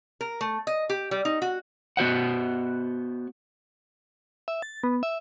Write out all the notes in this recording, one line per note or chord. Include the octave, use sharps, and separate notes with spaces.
A#4
A3
D#5
G4
G3
D#4
F#4
B3 F#4 C5 F#5
E5
A6
B3
E5